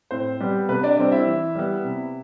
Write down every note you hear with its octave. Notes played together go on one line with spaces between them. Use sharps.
A2 C4 C5
G3 B3
C3 B3 B4
D4 D5
G3 C4 D4 D5
E4 E5
E3
G3 B3
C3